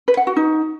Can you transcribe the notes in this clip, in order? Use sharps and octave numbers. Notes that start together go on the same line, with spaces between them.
B4
F#5
F#4
D#4